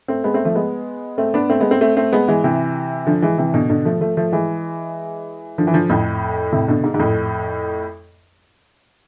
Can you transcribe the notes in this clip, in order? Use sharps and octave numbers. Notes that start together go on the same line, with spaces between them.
A3 C4
G#3 B3
A3 C4
F3 A3
G#3 B3
A3 C4
B3 D4
A3 C4
G#3 B3
A3 C4
A3 C4
A3 C4
G#3 B3
E3 G#3
C3 E3
D3 F3
E3 G#3
C3 E3
B2 D3
B2 D3
F3 A3
F3 A3
F3 A3
E3 G#3
D3 F3
E3
D3 F3
F2 A2
A2 C3
B2 D3
G#2
G#2
F2 A2